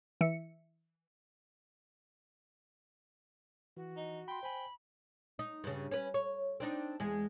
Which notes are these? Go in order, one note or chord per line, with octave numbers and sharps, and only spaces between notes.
E3 E5 C#7
E3 F#4
D#4
G5 B5 C6
C5 G#5 B5
D#4
G2 C#3
C#4 B4
C#5
C4 D4 D#4
E2 G#3